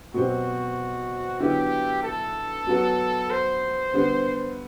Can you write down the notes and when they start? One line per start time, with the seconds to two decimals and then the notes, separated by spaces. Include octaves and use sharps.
0.14 B2 F#3 C4 F#4 G4 C5
1.40 D3 F#3 B3 E4 G4
2.03 A4
2.67 F#3 B3 F#4
3.30 C5
3.93 D3 G3 B3